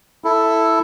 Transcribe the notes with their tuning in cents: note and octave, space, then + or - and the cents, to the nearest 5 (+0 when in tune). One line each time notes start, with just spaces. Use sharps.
E4 +0 A4 +0